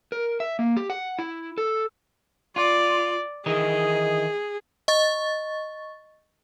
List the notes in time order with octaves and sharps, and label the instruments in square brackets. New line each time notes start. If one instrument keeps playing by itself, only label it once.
[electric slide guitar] A#4
E5
A#3
G4
F#5
E4
A4
[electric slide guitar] F4 [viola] D5
[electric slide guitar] D#3 E3 D#4 [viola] G#4
[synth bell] D#5 C#6 A6